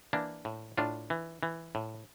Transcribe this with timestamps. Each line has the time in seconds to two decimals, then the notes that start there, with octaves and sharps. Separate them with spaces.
0.13 E3 A#3 D4
0.45 A2
0.77 A2 D4 F4
1.10 E3
1.43 E3
1.75 A2